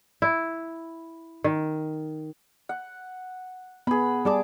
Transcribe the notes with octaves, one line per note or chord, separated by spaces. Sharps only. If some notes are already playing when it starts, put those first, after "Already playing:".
E4
D#3
F#5
B3 G#4 B5
G3 G#4 D5 A5 D6